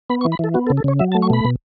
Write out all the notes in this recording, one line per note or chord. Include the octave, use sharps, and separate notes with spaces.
B3 B5
C#6
E3
B5
E3 A4
B3 F#4
A4
C#3
A4
C#3 C#5
F#3 E5
A5
A3
C#6
B2 B5
B2